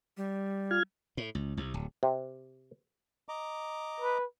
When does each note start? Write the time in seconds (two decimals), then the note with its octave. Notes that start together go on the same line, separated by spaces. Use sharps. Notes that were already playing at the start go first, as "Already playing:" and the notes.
0.17 G3
0.71 F4 F6 G#6
1.17 A2
1.35 C#2
1.57 C2
1.74 D1
2.03 C3
3.29 D#5 A#5 D6
4.00 B4